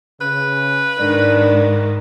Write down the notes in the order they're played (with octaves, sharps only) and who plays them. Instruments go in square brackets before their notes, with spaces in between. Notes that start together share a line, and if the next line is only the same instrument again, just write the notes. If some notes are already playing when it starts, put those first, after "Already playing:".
[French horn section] C#3 [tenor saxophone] B4
[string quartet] G#2 D#3 [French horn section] D4 D5